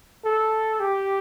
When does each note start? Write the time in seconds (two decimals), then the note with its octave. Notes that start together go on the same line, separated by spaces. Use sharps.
0.25 A4
0.80 G4